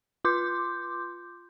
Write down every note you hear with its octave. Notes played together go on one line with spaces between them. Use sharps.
F4 C6 D6 G6